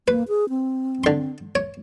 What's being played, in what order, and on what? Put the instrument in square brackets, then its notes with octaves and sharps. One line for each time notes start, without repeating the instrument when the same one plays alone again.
[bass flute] A#3 [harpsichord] B4
[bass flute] G#4
C4
[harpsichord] D3 C6
C#5